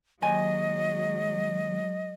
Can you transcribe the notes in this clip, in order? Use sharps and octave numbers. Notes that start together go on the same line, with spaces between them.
D#2 F#3 G#3 D#5 G#5